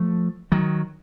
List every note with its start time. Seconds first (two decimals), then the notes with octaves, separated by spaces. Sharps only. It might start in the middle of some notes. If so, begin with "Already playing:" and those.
Already playing: F3 A3
0.52 D#3 F#3